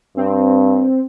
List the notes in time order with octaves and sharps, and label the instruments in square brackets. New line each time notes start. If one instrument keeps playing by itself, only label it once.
[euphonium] G2 [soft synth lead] C4